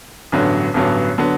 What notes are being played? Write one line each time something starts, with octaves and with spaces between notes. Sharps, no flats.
A1 G2 D3 F#3 B3
A1 G2 D3 F#3 B3
D3 F#3 B3